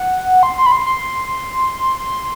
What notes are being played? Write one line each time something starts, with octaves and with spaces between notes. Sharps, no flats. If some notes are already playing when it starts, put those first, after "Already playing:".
Already playing: F#5
C6
C6
B5
C6
C6